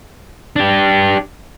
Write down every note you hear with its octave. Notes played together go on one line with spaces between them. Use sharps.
D4 G4